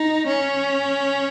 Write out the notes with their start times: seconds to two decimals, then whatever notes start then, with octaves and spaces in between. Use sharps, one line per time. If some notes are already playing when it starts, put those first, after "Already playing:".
Already playing: D#4
0.27 C#4